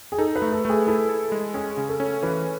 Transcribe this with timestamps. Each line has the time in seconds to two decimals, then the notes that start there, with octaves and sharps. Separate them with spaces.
0.12 G#4
0.18 D#4 A4
0.36 B4
0.42 A3
0.52 A4
0.65 A3 G#4
0.87 E4 A4
1.09 A4
1.32 G#3
1.54 C#4 G#4
1.77 C#3
1.89 A4
2.00 C#4
2.23 E3 B4